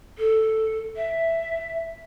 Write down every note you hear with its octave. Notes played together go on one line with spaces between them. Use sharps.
A4
E5